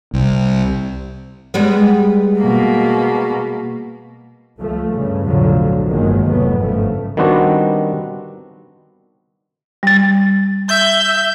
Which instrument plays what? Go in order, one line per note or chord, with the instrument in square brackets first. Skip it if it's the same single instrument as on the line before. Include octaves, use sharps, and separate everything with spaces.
[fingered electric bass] C2
[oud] G3 G#3 B3
[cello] B2 A#3
[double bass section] C#2 F3 A3
G2 C#3
B1 F2 A2 D3 F3 F#3
G1 D#3 F3 F#3 G#3 A#3
F1 G#2 C3 F#3 A3 B3
G1 C#3 F3 A3
[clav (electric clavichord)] D#3 G3 B3 C4 D4 F#4
[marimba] G3 A6
[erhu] E5 [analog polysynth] G6